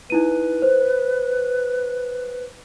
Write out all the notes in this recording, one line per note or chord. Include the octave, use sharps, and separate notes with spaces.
D#4 E4 B4 D#7
C5